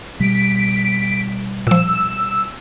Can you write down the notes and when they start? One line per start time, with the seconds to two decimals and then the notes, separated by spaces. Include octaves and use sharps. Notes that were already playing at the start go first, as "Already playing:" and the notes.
0.20 B2 G3 B6 D7
1.67 A#2 F3 E6